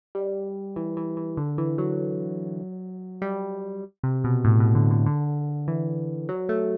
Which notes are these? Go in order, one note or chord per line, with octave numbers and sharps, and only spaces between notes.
G3
E3
E3
E3
D3
E3
F#3
G3
C3
B2
A2
B2
D3
D3
D3
E3
F#3
A3